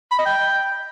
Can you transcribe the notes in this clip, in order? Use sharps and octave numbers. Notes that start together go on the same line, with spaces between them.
B5
D#5
G5